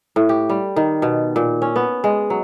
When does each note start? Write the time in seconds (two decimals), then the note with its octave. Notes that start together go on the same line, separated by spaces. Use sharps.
0.16 A2
0.29 G4
0.49 G3
0.76 D#3
1.02 B2
1.36 A#2
1.62 C#4
1.76 B3
2.04 G#3
2.30 F#3